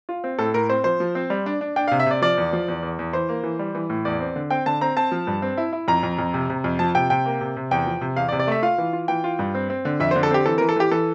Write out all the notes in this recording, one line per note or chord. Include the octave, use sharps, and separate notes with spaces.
F4
C4
A2 A4
A2 A#4
C4 C5
F3 C5
F3
C4
G3
D4
D4
D4 G5
F5
C3
E5
C3 D5
F3 D5
E2
F3
E2
E2
E2
E3 C5
A#3
E3
G3
E3
A2
E2 D5
C4
D3
C4 G5
D3 A5
C4 A#5
C4 A5
F3
G2
C4
E4
E4
F2 A#5
F2
F2
C3
C3
F2
F3 A5
C3 G5
C3 G5
A#3
C3
C3
E2 G5
F3
C3
E2 F5
D5
C3
D5
A3 E5
F4 F5
E3
F4
E3 G5
F4
G2
C4
C4
D3
F2 E5
C5
D3
A4
C4 G4
E3 A4
A#4
E3
A4
E3 G4
E3 A4